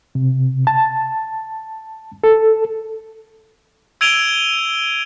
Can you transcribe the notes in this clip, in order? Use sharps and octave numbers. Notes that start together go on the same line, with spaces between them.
C3
A5
A4
E6 G#6 D7 D#7 F7 G7